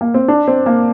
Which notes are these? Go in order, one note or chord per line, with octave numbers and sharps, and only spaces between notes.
A#3
C4
D4
C4
A#3